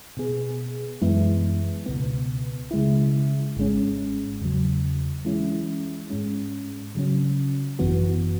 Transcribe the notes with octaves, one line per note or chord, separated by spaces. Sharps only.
B2 B3 G#4
F#2 E3 G#3 B3 E4
C#2 B2 B3
C#3 G#3 E4
G#1 G#2 G#3 C#4
E2 C#3 F#3
E3 G#3 C#4 E4
G#2 G#3 C#4
C#3 F#3 C#4
G#1 F#2 E3 B3 F#4